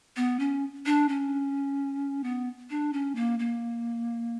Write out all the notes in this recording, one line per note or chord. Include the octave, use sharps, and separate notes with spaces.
B3
C#4
D4
C#4
B3
D4
C#4
A#3
A#3